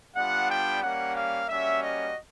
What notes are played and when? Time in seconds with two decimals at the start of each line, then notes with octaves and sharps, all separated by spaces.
0.15 G3 B3 D4 F4 F#5
0.49 G5
0.82 G3 A#3 C#4 F#5
1.15 F5
1.49 G3 A#3 C#4 F#4 E5
1.82 D#5